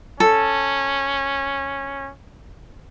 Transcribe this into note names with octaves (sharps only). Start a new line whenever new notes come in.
C#4 A4